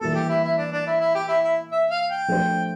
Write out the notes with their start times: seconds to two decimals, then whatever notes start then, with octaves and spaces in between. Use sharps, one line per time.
0.01 E3 G3 A#3 A4
0.15 G4
0.29 E4
0.44 E4
0.57 D4
0.72 D4
0.87 E4
1.00 E4
1.15 G4
1.28 E4
1.44 E4
1.72 E5
1.90 F5
2.10 G5
2.28 F3 A3 D4 G4 C5